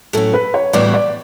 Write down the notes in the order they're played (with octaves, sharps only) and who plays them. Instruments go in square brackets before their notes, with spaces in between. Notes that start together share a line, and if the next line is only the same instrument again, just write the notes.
[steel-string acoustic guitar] A2 F#3 C#4 [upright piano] A4
[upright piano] B4
C#5
[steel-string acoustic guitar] A2 E3 G3 B3 F#4 [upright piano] D5
[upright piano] D5